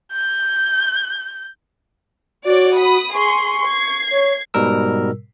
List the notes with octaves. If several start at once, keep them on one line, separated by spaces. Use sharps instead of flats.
G6
F#4 C#5 D5
B5 D#6
G#4 C6 C#6
G#6 C7
C#5
G#2 B2 G3 A#4 E6